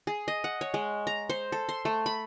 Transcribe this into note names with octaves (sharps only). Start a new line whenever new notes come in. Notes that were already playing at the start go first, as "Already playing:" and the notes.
G#4
D#5
F#5
C#5
G#3
A#5
C5
A4
C6
A3
B5